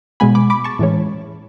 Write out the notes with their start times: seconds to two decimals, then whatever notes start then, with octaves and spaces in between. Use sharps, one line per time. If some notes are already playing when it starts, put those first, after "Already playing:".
0.20 B2 G#3 B3 G#5 B5
0.35 B5 D6
0.50 B5 D6
0.64 A5 C#6
0.79 A2 E3 G#3 C#4